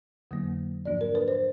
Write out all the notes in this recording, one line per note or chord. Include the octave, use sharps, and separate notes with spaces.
F2 D3 F#3 A#3
G#2 F3 A#3 D4 D5
A#4
B4
C5